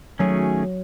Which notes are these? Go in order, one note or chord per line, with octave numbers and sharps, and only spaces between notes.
D#3 F#3 A3 C#4 G#4